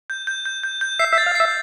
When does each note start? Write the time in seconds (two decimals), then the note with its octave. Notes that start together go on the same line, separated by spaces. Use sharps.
0.10 G6
0.27 G6
0.46 G6
0.64 G6
0.81 G6
0.99 E5 C7
1.12 E5
1.18 A6
1.26 F5
1.35 E5 C7